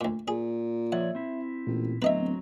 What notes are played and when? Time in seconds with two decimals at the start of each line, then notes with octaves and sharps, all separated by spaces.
0.01 D2 A#2
0.28 A#2 G#4
0.92 F3 C#5 D5 E5 F#5
1.15 C4 E4
1.67 A1 A#2
2.02 D1 F#3 B3 C4 B4 D#5 E5 A#5